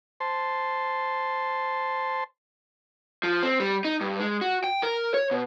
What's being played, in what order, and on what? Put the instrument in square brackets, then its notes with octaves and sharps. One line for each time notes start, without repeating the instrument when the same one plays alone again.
[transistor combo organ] C5 A5 C6
[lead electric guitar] F3
C4
G3
D#4
G2
G#3
F#4
G5
A#4
C#5
B2